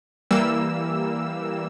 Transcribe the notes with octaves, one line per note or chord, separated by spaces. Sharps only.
E3 G3 A#3 E6